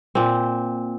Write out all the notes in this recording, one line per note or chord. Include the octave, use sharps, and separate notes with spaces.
A#2 C4